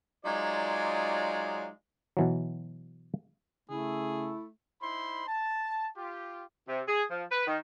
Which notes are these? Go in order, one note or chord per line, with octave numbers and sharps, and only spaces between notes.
F#3 G#3 D#4 F4 D5
B2 E3 F#3
C#3 A3 E4 G#4
D#4 E4 C5 B5 C6
A5
F4 G4
C3
G#4
F3
B4
D#3